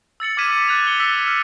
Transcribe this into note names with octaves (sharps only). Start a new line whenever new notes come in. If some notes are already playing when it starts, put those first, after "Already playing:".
E6 A6 C#7 F#7
D6 F6 G#6 B6 D#7 E7
D6 F#6 A6 F7
F#6 C#7 G7
E6 B6 C#7
F6 F7